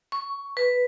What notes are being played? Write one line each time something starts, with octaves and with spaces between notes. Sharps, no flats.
C#6
B4